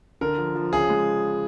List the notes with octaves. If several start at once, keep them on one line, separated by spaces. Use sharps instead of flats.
D3 A#4
F3
F3
C#3 G#4
G#3